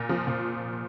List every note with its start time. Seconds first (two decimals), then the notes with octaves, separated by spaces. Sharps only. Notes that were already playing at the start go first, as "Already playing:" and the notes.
Already playing: A#2
0.09 F3
0.27 A#2